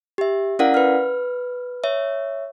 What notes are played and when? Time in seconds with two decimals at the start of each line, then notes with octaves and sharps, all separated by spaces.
0.18 G4 E5
0.59 C#4 E4 A#4 D5 F5 F#5
0.74 B4 F6
1.84 C#5 E5